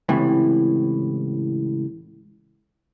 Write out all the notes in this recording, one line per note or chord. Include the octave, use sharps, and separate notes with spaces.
C#2 A2 C3 E3